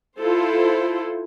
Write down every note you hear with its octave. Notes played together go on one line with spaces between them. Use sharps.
E4 F4 A4 C5